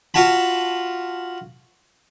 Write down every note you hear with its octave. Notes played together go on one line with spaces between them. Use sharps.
F4 F#4 A5 B5